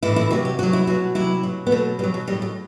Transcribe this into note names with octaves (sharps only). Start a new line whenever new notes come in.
A2 E3 E4
E4
C3 F#3 F#4
G4
C3 F#3 F#4
E4
B2 F#3 F#4
C3 F#3 E4
B2 F#3
B3
B2 F#3 A3
B2 F#3 G3
F#3
A2 F#3 G3
F#3